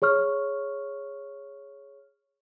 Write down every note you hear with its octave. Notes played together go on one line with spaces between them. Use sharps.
G#4 C#5 C#6 F6